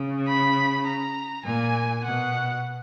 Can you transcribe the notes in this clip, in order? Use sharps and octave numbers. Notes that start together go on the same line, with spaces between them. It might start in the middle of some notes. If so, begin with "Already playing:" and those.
Already playing: C#3
B5
A#5
A#2 G#5
B2 F#5